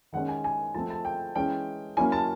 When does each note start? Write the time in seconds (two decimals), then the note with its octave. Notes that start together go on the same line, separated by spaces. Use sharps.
0.13 D#3 G#3 C#4 F#5
0.28 G#5
0.44 G#5
0.74 F3 A3 C4 A5
0.90 A5
1.05 G5
1.35 E3 G#3 C#4 G5
1.97 F#3 A#3 C#4 E4 G#5
2.12 A5